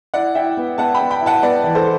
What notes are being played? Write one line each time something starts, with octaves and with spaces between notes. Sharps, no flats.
E4 D5 F#5
E4 E5 G5
B3
B3 F#5 A5
G5 B5
B3
G5 B5
E4
F#5 A5
B3 B4 D5
E3
A4 C5